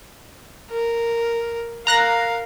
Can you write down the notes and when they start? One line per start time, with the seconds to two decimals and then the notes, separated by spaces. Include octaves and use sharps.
0.71 A#4
1.87 A#4 F5 A#5 F#6 A#6